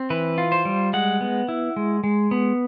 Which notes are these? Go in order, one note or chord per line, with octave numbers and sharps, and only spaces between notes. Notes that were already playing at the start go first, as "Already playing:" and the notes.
Already playing: C4
E3 B4
F4
C5
G3
G#3 F#5
B3
E4
G#3
G#3
B3